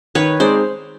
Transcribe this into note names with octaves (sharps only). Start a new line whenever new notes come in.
D#3 B4 C#5
G#3 C4 D#4 C5 D5